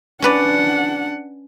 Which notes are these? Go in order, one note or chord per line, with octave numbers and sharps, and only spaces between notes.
C#4 D4 B4 D5 F#5